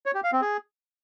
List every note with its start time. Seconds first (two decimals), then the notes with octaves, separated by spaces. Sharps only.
0.06 C#5
0.15 G4
0.24 F5
0.33 C4
0.42 G#4